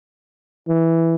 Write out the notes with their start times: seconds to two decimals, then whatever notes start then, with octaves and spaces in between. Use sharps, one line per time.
0.68 E3